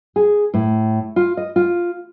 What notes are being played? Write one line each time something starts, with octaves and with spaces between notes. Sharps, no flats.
G#4
A2
F4
D#5
F4